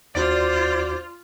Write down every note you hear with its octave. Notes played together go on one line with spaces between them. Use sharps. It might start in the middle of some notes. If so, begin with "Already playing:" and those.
D#2 D4 F4 F#4 C5 D5